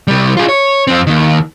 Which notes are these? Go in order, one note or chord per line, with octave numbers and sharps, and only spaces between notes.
C3 G3
F4 G#4
C#5
F2 C4
D#2 D#3